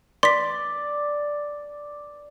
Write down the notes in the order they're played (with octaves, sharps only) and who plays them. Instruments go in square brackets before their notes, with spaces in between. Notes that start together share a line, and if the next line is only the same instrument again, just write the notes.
[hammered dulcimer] D5 [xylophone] C6 B6